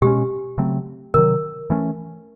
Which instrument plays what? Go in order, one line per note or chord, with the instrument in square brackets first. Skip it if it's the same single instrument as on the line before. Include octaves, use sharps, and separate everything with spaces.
[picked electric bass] B2 G#3 C#4 [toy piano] G4
[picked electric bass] C#3 F#3 A3 C4
[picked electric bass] C3 D#3 F#3 [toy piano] A#4
[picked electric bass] E3 A3 C#4